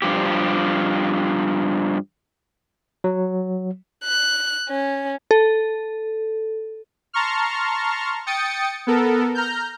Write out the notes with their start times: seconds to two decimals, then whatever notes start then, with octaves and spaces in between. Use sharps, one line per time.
0.02 G2 F3 G4
3.04 F#3
4.04 F#6
4.69 C#4
5.31 A4
7.13 A5 A#5 C6 C#6 F6
8.26 G5 D#6 A6 C#7
8.87 B3 A4 A#4
9.35 A#5 F6 G6